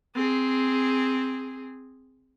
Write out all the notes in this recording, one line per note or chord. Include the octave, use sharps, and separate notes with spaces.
C4 G#4